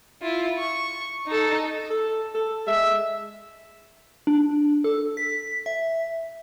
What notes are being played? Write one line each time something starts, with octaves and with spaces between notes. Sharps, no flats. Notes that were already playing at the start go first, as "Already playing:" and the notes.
E4 F4
C#6
D#4 A4
A4
A4
G#3 E5
D4
A4
B6
E5